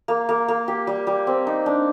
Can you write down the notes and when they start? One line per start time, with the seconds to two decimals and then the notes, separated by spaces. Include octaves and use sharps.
0.08 A#3
0.29 A#3
0.48 A#3
0.68 G4
0.87 G3
1.07 G3
1.27 C4
1.47 D#4
1.66 D4